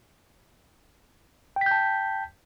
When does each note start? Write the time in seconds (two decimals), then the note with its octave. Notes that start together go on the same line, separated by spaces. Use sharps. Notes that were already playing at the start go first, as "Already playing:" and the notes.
1.56 G5
1.61 B6
1.66 G6
1.71 A5